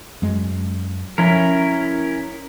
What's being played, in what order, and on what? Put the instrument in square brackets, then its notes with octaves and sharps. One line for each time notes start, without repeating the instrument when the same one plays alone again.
[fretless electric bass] F#2 G#3
[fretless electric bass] F3 [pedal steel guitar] C#4 E4 A#4